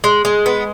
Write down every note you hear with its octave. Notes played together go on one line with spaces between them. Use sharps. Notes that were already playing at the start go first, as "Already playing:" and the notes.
G#3
G#3
B3